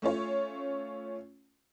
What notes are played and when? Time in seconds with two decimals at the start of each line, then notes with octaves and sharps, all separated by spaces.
0.02 A3 C#4 F4 C#5